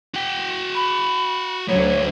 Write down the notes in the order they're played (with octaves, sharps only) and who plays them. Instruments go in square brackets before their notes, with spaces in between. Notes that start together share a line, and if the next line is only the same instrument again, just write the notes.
[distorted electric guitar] F#4 G5
[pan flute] B5
[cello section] D2 F#3 [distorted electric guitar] A3 B4 [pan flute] C#5